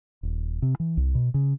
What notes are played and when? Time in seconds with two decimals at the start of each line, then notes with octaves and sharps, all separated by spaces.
0.23 D#1
0.62 C3
0.80 E3
0.97 C2
1.15 B2
1.34 C#3